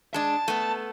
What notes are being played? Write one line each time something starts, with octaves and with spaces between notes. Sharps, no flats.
G#3 D4 A5
A3 B3